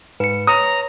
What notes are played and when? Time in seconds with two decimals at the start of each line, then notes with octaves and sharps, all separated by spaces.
0.20 G#2 B4 C#7
0.47 C#5 A#5 D#6